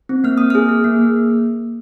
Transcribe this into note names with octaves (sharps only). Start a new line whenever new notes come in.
C4
A#3 F6
A#3 D#6
G#4 F6
G#4
A#3
A#3